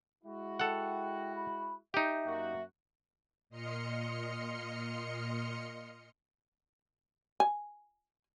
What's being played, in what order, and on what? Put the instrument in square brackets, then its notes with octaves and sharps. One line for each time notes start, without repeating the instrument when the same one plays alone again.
[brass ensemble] G#3 E4 F#4
[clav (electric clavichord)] A4 F#5 [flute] G5
[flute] B5
[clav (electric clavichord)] D#4 G4 [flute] E5
[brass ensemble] F#2 A#3 F#4
[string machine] A#2 D#5 C6 F6 C#7
[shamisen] G#5